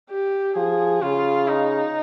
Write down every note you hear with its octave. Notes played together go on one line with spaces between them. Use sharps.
G4
F3 G#4
C#3 F4
D#4